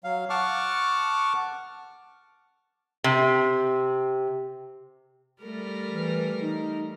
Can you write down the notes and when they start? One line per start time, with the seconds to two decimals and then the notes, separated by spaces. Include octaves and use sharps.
0.04 F#3 F5
0.30 F#5 A5 C#6 D6 F6
3.04 C3
5.42 G3 A3 A#4
5.88 E3
6.41 D#4